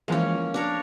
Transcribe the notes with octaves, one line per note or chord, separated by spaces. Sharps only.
E3 F3 G#3 A#3 C#4
D4 A#4 C#5